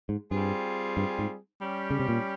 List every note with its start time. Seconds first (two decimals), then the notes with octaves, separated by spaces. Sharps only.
0.09 G#2
0.31 G2 G3 C4 F4 G#4
0.97 G2
1.19 G#2
1.62 G3 C#4 G4
1.91 C#3
2.00 C3
2.09 A#2